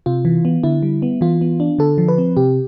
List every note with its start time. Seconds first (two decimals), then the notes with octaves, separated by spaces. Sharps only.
0.06 C3 F4
0.25 E3
0.45 B3
0.63 D3 E4
0.83 G3
1.02 B3
1.21 E3 F4
1.41 B3
1.60 D4
1.79 D3 A4
1.98 F3
2.08 B4
2.18 C4
2.37 C3 G4